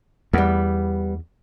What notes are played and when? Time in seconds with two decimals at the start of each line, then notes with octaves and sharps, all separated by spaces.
0.33 E2 G3 B3